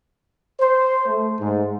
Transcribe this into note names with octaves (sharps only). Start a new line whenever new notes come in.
C5
A3
G#2